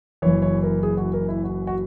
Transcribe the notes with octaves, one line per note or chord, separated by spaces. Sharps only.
F#1 F#2 E3 C#5
C#5
A#4
G#4
F#4
A#4
E4
F#4
F#4